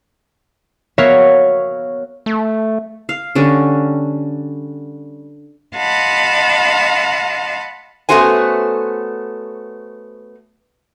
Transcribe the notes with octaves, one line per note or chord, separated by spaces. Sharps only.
B3 F#4 A#4 C#5 E5 F5
A3
F5
D3 G3 C#4
D#5 F5 F#5 A5 B5 C6
A3 B3 C#4 F#4 C5 G#5